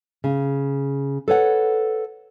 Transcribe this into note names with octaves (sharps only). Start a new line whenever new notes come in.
C#3
A4 B4 C#5 F#5